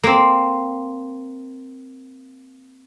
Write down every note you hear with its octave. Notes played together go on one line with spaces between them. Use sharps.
A#3 C4